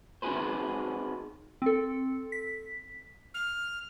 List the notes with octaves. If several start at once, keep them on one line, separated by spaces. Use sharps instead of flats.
C4 D#4 F#4 G#4 B4 C5
C4 A4
B6
F6